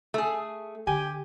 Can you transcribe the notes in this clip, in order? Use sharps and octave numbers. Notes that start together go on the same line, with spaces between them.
A3 G#4
D3 G4 G#5